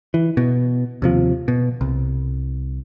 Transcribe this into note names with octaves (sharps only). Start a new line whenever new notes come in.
E3
B2
D#2 C3 F3
B2
C2